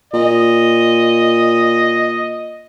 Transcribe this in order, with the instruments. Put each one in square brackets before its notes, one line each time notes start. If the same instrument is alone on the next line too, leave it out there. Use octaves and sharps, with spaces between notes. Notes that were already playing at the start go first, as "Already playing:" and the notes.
[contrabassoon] A#2 [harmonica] D#5